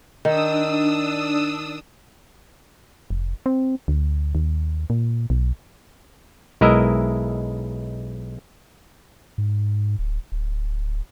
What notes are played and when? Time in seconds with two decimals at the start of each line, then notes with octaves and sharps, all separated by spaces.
0.25 D#3 D4 D#6 E6
3.10 F1
3.46 C4
3.88 D2
4.35 D#2
4.90 A#2
5.30 B1
6.61 B1 G#3 E4 A#4 D#5 E5
9.38 G#2
9.99 D1
10.32 D1